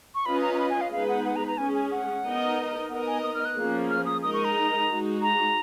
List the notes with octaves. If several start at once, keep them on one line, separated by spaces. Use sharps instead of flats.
C#6
C#4 F4 B4 D#5 B5
A#5
A#5
B5
G#5
F5
G#3 B3 D#4 G#4 B4 F5
F#5
F#5
A#5
A#5
G#3 C#4 G#4 G#5
G#5
F#5
B3 D#4 A#4 D#5
B3 D#4 A#4 D#5 F#5
G#5
D#6
F6
F#6
F3 A#3 C#4 G#4
F6
D#6
G#3 D#4 A#4 D#5 D#6
C#6
A#5
G#3 D#4 F#4
A#5